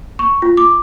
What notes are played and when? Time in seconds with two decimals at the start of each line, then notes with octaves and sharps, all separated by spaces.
0.19 C#6
0.42 F4
0.57 D6